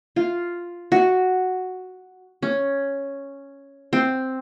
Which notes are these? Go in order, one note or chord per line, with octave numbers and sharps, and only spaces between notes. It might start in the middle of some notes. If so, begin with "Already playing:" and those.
F4
F#4
C#4
C4